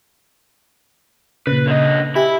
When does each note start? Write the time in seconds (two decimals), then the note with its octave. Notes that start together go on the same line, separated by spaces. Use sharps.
1.47 A#2 C#3 B4
1.67 D3 D#5
2.15 E4 G4 G#5 B5